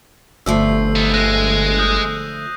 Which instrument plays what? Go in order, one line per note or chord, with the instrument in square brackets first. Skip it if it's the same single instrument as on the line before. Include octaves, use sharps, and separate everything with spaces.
[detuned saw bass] G1 [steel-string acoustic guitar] D3 F3 A3 [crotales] E6 C7
[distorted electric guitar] B3 D#4
[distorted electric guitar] G#3 [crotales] F#6 A#6 D#7
[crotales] D#6 G6